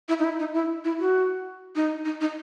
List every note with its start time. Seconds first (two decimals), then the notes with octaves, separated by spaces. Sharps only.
0.08 E4
0.19 D#4
0.24 E4
0.40 D#4
0.54 E4
0.84 E4
1.00 F#4
1.76 D#4
2.05 D#4
2.21 D#4